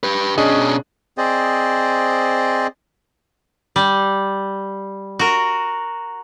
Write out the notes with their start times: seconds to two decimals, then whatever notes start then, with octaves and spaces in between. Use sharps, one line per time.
0.03 G4 B4
0.38 B2 C#4 D4 G#4 D#5
1.18 C4 G#4 C5 D5 D#5
3.76 G3
5.19 F#4 A#4